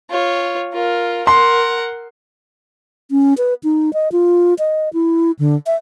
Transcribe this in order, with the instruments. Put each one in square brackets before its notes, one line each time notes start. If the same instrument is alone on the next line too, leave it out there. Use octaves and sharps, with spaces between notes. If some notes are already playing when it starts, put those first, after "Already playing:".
[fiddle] F4 C#5
F4 A#4
[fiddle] A#4 F#5 [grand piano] C6
[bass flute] C#4
B4
D#4
D#5
F4
D#5
E4
D3
E5